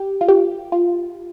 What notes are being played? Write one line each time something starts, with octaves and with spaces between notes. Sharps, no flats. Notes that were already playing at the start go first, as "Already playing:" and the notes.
Already playing: G4
F4
G4
F4